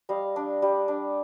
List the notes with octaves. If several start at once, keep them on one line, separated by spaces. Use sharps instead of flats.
G3 D#5 F5
D4
G3
D4